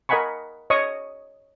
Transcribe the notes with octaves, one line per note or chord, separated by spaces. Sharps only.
A#4 D#5 F#5 G#5 B5 C#6
C#5 D#5 C#6 D#6